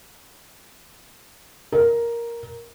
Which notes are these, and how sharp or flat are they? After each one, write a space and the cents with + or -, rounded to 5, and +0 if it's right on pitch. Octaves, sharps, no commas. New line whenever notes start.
A#4 +5